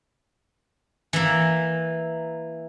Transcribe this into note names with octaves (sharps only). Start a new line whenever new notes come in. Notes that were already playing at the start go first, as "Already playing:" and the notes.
E3 A#3